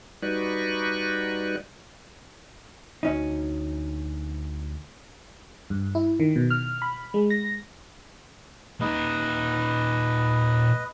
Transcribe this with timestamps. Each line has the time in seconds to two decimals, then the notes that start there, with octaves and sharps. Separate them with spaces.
0.22 G3 D#4 F#4 B4 D5 C#6
3.03 D2 C#4 D#4
5.70 G2
5.95 E4
6.20 D#3
6.36 B2
6.50 F6
6.82 B5
7.14 G#3
7.30 A#6
8.81 A#2 D#4 B4 D#5